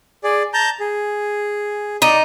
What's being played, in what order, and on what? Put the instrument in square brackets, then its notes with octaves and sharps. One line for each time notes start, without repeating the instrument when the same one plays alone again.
[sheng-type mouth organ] G#4 D5
A5 A#5 G6
G#4
[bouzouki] D#4 [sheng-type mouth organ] D5